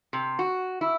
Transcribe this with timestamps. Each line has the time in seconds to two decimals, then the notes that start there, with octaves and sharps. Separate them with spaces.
0.13 C3
0.39 F#4
0.81 E4